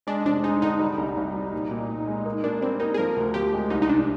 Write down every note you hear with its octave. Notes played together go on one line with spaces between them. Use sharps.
G#3 D4
F1 D4
G#3 D#4
D3 D#4
G3
C2
C2
G3
A#2
A#2
A#2
G#3
A#3
A#3 D4
G3 C4
A#3 D#4
G#4
F3 A#4
D2
F3 G4
G#3
C2 D#4
D#4
C3 D4